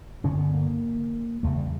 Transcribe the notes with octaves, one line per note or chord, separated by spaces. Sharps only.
G2 D3 C#4
B3
A#3
E2 C#3 A3
G3